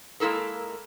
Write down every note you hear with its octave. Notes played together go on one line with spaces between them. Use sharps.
G#3 A#3 E4 A4 A#4